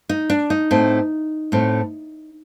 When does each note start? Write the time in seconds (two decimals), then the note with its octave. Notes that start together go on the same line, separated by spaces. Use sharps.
0.09 D#4
0.30 D4
0.50 D#4
0.71 A2 A3 C4
1.52 A2 A3 C4